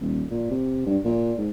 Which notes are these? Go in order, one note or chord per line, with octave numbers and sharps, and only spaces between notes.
D#1
A#2
C3
G2
A#2
G#2